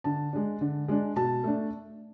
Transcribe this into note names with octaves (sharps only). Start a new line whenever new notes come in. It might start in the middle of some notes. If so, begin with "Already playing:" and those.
D3 A5
G#3 D4
D3
G#3 D4
B2 A5
A3 D4